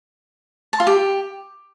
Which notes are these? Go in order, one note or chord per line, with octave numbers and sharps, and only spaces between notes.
A5
F4
G4